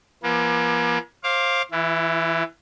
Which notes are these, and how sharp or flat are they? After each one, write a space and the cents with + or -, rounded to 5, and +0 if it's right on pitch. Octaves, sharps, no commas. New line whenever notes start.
F3 -45 A#3 +45
C5 +30 F5 +0 D6 +0
E3 +0 E4 +40